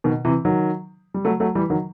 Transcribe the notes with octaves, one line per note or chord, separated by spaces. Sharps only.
B2 D#3
C3 E3
D#3 F#3
G3
F#3 A3
F#3 A3
E3 G3
D#3 F#3